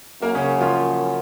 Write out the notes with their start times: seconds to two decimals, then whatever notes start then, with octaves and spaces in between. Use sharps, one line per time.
0.22 F#2 A#3 A#4
0.35 C#3 C#4
0.61 F3 F4